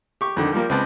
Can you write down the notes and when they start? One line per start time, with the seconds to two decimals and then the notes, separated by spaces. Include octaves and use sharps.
0.21 G4 C#6
0.37 F2 D3 D#3
0.52 F3 G3 A#3
0.69 C#2 C4 B4 A5